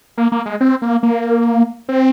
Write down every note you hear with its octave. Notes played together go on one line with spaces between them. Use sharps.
A#3
A#3
G#3
C4
A#3
A#3
C4